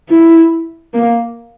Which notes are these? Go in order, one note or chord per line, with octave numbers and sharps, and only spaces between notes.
E4
A#3